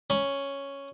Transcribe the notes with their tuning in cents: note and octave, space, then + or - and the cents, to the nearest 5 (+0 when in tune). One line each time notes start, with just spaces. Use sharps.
C#4 +0 B5 -30